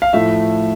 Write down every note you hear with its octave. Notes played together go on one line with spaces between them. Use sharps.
F5
A2 F3 A3 E5